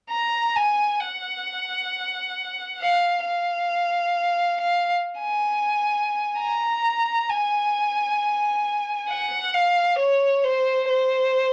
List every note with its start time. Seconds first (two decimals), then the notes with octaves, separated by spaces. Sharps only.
0.11 A#5
0.56 G#5
1.01 F#5
2.80 F5
3.25 F5
4.60 F5
5.20 G#5
6.40 A#5
7.29 G#5
9.09 F#5
9.54 F5
9.99 C#5
10.44 C5
10.89 C5